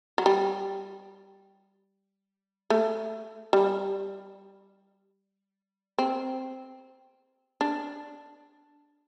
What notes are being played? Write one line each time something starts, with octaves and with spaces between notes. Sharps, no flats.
F#3
G3
A3
G3
C4
D4